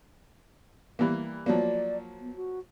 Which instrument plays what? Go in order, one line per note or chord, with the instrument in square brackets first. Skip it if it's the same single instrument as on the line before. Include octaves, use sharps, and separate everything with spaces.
[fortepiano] E3 G3 A#3
[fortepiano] F3 F#3 A#3 [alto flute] D5
[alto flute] B3
F#4